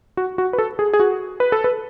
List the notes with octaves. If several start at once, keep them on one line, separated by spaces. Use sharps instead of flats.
F#4
F#4
B4
A4
G#4
G#4
F#4
B4
A4
B4